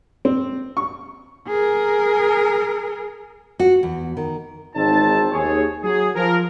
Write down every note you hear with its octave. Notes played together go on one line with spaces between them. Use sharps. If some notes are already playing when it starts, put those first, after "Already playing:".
C4
C#6
G#4 A#4
F#4
E2
D#3
G#1 G#2 E3 C4 D#4 A5
D#2 G#4 C#5
F#3 G#4
F3 A#4